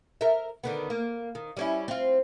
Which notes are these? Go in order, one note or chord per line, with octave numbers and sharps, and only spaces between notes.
A#4 E5
D3 D#3 B3
A#3
D#3
G3 C#4 E4
C4 F4